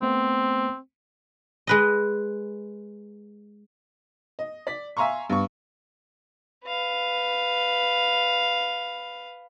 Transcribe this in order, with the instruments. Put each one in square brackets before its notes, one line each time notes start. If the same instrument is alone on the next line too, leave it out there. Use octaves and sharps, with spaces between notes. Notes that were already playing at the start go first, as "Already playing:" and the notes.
[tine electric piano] A3 B3 C5 [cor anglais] C4
[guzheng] G#3 B4 D#5
[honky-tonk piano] D#5
D5 B6
E5 F5 G#5 A#5 C6 C#6
G2 B3 C#6
[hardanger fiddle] B4 F5